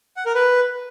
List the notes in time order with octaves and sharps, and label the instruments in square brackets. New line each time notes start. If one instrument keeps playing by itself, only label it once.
[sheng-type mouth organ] F#5
A#4
B4